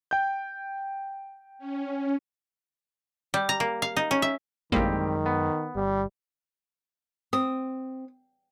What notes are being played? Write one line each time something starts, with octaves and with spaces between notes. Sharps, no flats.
G5 G6
C#4
G3
A#5
A#3
F5
D#4
C#4
E5
A1 F#2 D#3 G3 G#3 A#3 C4 G4
B3
G1 G3
C4 D#6